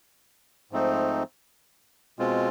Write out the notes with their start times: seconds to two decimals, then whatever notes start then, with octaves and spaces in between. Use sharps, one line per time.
0.71 G#2 F3 A3 C4 D#4
2.19 B2 G#3 C4 F4